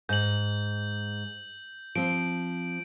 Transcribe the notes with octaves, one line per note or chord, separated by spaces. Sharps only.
G#2 G6 F#7
F3 C4 D7